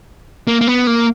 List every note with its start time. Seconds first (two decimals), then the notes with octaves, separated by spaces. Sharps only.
0.47 A#3
0.61 A#3
0.67 B3
0.87 A#3